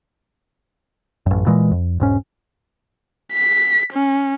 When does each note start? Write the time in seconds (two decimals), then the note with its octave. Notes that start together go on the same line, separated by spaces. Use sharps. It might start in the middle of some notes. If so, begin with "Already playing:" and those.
1.26 A1 F#2
1.46 A#2 E3 G#3
1.71 F2
2.00 E1 G#2 C#4
3.33 B6
3.93 C#4